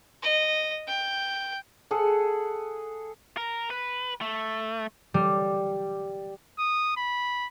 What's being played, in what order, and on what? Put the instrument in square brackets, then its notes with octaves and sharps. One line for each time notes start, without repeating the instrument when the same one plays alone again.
[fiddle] D#5
G5
[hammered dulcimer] G#4 A4 F#5
[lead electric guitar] A#4
B4
A3
[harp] G3
[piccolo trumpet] D#6
B5